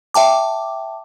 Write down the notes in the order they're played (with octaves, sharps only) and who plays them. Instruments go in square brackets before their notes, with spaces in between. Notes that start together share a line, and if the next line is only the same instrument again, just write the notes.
[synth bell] E5 G5 A5 D6